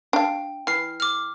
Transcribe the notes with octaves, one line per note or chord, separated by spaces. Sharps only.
D4 F5 G5
E3 F6 C7
D6 F6